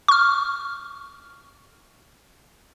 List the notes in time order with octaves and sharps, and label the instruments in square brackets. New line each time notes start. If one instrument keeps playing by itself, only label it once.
[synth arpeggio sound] C#6 F6